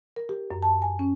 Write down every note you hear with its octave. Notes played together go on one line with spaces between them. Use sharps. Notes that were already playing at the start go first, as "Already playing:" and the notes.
A#4
G4
F#2
A5
G#5
C#4